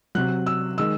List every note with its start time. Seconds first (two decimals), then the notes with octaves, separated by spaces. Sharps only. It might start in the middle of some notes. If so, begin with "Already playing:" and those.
0.15 C3 F#3 F#6
0.46 E6
0.78 D#3 G#3 E6